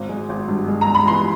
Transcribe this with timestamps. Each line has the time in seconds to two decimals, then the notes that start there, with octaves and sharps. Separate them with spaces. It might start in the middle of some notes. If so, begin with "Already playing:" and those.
Already playing: G#1
0.09 G#3
0.29 G#1
0.48 G2
0.68 G#3
0.81 A#5
0.87 G#3
0.95 B5
1.07 E3 C6